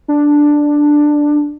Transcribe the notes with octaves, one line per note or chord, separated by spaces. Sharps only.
D4